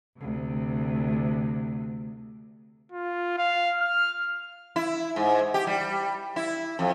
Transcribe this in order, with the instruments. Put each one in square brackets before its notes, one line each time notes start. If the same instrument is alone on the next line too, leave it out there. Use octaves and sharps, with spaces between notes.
[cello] D2 C3
[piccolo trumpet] F4
F5
F6
[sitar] E4
G#2
G4
G3
E4
F2